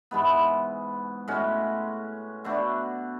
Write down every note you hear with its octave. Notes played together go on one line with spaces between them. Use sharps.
G#2 E3 G#3 B3
A2 G#3 C#4 F#4
B2 A3 D4 F#4